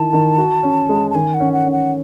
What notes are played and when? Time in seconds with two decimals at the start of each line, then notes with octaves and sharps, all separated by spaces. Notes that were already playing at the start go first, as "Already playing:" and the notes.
Already playing: D#3 E4 A5
0.13 D#3
0.38 F#4
0.63 C#4
0.89 G#3
1.10 A5
1.15 D#3 G#5
1.34 F#5
1.40 C#4
1.53 F#5
1.65 C#4
1.72 F#5